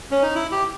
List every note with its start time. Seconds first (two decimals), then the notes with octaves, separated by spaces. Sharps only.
0.11 C#4
0.22 D#4
0.35 E4
0.52 G4